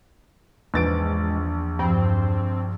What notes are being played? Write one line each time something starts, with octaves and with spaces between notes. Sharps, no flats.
A#1 E2 G#2 B4 A6 D7
G2 F3 C4 B5